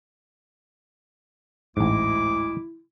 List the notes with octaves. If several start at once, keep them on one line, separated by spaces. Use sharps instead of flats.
A1 D2 G#2 G#3 E4 D6